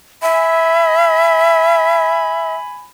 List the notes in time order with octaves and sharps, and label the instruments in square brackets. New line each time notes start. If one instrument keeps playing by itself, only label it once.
[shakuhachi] E5 [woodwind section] G#5 B5